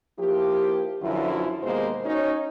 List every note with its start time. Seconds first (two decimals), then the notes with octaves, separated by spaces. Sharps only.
0.19 F3 A#3 E4 G4
1.02 F#2 D3 E3 F3 E4 F4
1.63 D#2 B2 G#3 A#3 C5
2.05 C#4 D#4 F#4 C#5